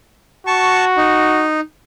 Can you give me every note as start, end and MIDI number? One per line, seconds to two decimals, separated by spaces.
0.47 1.47 66
0.47 0.85 81
0.47 0.85 85
0.97 1.60 63